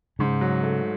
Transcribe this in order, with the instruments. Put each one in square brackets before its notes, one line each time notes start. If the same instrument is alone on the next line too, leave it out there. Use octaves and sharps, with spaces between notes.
[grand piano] G#2 [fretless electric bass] C#3
[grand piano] F#3
A3